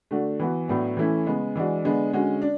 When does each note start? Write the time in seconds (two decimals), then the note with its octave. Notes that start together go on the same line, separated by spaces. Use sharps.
0.11 D3 A3 D4 F#4
0.40 E3 B3 F#4
0.68 A2 F#3 B3 D4
0.97 E3 A3 C#4 E4
1.26 C#3 G#3 B3
1.56 E3 G#3 D4 F#4
1.84 D3 G#3 B3 D4
2.13 D3 G#3 C#4 F#4
2.42 D4